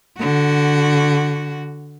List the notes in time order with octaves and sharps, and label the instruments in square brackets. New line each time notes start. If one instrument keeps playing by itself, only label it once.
[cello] D3 F#4